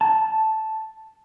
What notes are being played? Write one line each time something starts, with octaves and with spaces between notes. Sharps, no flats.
A5